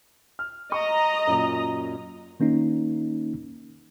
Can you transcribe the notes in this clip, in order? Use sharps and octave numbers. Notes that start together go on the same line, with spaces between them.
F6
D#5 A#5 C#6
F#2 A#2
D#3 A#3 C#4 D#4